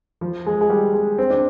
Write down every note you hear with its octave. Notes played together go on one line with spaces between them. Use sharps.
F3
G#3
G#3
G3
G#3
C4
D4